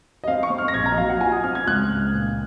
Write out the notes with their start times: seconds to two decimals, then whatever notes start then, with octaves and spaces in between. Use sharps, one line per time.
0.24 D#5
0.28 C4 F5
0.43 C#6
0.50 C4
0.58 F6
0.68 A#6
0.74 A#1 G#6
0.86 A#5
0.92 D#5
0.97 F#3 F5
1.09 F#5
1.20 F4 G#5
1.32 D#6
1.44 C4 F6
1.55 G#6
1.67 C#2 F#6
1.90 C#2
2.13 A#2